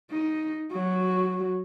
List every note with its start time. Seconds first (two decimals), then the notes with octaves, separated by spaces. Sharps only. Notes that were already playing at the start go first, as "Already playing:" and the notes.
0.10 D#4
0.72 F#3 F#4